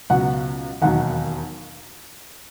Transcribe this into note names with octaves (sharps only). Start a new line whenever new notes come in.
C#2 B2 F#3 F#5
E1 D#2 D#3 F#3 F#5